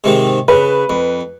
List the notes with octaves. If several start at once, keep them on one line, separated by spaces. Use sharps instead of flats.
G#2 C3 D#3
C#3 B4
F2